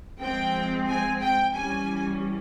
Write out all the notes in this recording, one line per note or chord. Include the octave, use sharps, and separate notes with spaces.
F3 G#3 C4 G5
G#5
G5
E3 G3 C#4 G#5